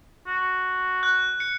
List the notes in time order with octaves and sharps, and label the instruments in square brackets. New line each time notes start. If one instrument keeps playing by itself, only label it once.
[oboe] F#4
[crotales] F#6
C#7